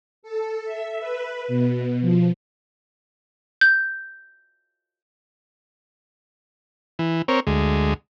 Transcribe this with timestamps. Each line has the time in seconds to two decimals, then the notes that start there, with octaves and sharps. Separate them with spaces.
0.23 A4
0.65 E5
1.00 B4
1.48 B2
2.01 F3
3.61 G6
6.99 E3
7.28 C4 A#4 C#5
7.47 D2 G#3